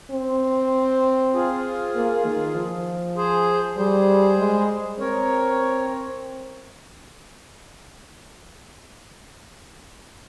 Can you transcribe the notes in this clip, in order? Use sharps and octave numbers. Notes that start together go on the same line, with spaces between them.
C4
F4 G#4
A#3
D#3
F3
G#4 C5
G3 G#4 C5
G#3
C4 A#4 C#5